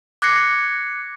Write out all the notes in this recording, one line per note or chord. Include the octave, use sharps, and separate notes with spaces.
D6 F#6 G#6 A#6 C7 C#7